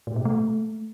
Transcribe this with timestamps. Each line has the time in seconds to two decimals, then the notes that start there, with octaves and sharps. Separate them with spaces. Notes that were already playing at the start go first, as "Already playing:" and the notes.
0.07 A2
0.16 B2
0.25 A3